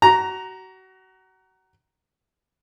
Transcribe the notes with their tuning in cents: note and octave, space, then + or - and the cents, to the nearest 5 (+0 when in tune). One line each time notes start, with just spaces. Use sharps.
F#4 +30 A#5 +0